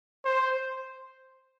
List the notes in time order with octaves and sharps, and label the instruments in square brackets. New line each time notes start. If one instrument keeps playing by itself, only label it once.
[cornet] C5